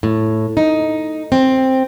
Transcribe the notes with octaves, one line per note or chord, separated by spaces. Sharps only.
A2
D#4
C4